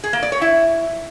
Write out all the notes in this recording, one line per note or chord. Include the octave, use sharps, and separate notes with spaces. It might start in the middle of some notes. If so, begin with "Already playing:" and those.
G#4
A#3
D5
C#5
E4